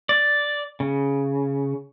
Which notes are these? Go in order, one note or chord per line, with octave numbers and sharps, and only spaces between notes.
D5
C#3